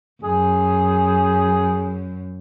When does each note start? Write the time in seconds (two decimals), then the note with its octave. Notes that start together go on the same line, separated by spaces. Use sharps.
0.23 F#2 G#4